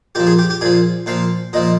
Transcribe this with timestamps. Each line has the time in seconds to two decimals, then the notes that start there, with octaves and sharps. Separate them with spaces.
0.15 A#2 F3 G4
0.27 G#4
0.38 G4
0.50 G4
0.61 A#2 F3 G#4
1.06 A#2 F3 F5
1.53 A#2 F3 D#5